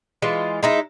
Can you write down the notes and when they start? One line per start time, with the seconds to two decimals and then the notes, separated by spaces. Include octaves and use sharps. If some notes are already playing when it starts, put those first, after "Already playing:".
0.22 E3 G#3 F4
0.63 G#3 D#4 E4